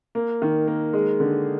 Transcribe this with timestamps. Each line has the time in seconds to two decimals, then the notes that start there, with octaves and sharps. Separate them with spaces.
0.15 A#3
0.42 D#3
0.68 A#3
0.93 G#3
1.20 D3